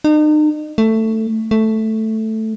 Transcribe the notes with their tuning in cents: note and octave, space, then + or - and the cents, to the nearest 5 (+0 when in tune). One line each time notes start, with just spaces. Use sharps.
D#4 -40
A3 +10
A3 +0